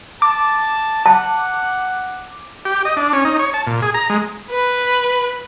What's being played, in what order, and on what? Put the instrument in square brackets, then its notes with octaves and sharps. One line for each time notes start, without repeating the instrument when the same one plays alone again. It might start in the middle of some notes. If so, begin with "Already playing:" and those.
[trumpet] A5 [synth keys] D6
[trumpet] F#5 [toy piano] A5
[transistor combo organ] G4
D#5
D4
C#4
D#4
C#5
A5
A#2
G#4
A#5
G#3
[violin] B4